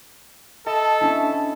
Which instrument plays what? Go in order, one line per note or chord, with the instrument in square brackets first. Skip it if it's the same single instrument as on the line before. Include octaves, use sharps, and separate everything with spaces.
[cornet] A4 [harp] D#5 A5 B5
[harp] C#4 D4 E4